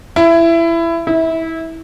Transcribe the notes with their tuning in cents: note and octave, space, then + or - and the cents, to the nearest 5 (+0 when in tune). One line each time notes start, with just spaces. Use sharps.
E4 +20
E4 -20